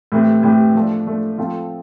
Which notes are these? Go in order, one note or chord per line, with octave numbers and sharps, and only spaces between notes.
A2 E3 A3 C4 G4
A2 E3 A3 C4 G4
F3 A3 D4
F3 A3 D4
F3 C4 F4 A4